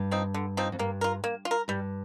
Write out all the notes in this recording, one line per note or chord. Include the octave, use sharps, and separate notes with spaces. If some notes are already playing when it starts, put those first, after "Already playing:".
Already playing: G2
F3 C4 D#4
D3
F3 C4 D#4
F2
G2 A#3
F4 A#4
A#3
F4
A#4
G2 G3